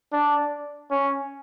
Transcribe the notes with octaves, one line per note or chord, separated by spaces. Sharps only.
D4
C#4